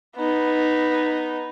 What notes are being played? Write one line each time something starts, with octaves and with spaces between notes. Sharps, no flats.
B3 D#4